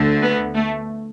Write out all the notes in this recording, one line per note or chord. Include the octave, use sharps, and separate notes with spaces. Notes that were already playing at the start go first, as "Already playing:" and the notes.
Already playing: D2 D3 A3
B3
A3